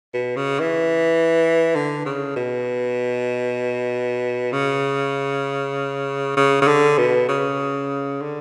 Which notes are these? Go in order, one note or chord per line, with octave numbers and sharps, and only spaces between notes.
B2
C#3
E3
D3
C#3
B2
C#3
C#3
C#3
D3
B2
C#3
D3